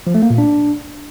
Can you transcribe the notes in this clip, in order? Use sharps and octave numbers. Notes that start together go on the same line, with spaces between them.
F3
A3
A#3
A#2
D4